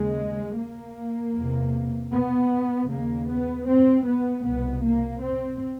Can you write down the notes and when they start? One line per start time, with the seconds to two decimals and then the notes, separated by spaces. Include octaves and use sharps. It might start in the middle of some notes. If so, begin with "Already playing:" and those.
Already playing: D#2 C#3 G#3
0.56 A#3
1.34 E2 C3
2.12 B3
2.89 D#2 C#3 A#3
3.28 B3
3.67 C4
4.05 B3
4.44 C2 B2 B3
4.82 A#3
5.21 C4